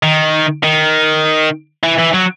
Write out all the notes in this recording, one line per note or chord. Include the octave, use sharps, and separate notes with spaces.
D#3
D#3
E3
E3
F#3